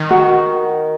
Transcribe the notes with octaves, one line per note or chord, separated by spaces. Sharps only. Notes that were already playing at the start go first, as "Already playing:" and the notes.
Already playing: D#3
F#4